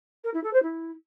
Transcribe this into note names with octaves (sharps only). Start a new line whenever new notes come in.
A#4
E4
A4
C5
E4